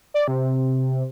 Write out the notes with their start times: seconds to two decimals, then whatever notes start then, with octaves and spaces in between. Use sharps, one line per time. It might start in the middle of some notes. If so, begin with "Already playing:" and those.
0.14 D5
0.28 C3